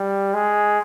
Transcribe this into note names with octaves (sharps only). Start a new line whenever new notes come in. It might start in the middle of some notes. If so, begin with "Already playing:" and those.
Already playing: G3
G#3